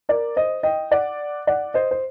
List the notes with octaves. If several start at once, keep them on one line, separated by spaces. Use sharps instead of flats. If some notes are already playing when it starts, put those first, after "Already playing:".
A#4 D5
C5 D#5
D#5 G5
D5 F#5
D5 F#5
C5 D#5
C5